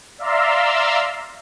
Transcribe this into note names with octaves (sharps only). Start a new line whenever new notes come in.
D5 E5 F5 A#5 C6 E6